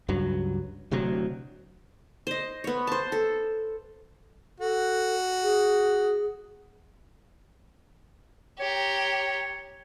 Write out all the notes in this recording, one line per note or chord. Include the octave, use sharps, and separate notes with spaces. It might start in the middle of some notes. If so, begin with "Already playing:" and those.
C#2 G2 F#3
D1 D2 C3 F#3
C5 D#5
B3 C#5
C5 A5
A4
F#4 A4
G#4
G4 C#5 A#5